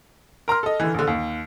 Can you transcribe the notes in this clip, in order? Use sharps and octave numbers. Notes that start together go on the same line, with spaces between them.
A#4 A#5 C6 F6
A4 D#5
D3 E3
A#1 D3
D#2